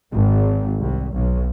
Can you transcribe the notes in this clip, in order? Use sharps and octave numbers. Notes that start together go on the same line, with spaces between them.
G#1
C2
B1